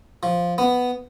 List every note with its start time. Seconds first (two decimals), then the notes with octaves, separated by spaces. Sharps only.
0.23 F3
0.58 B3